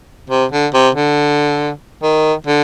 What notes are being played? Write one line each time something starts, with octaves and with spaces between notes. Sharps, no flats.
C3
D3
C3
D3
D#3
D3